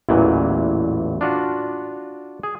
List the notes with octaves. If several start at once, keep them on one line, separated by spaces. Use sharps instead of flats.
A1 E2 A#2 E3 F#3
D4 F4 F#4
G#4